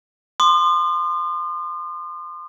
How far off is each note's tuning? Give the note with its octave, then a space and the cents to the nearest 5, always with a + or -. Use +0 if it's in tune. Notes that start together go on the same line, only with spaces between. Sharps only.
C6 -5 D#6 -45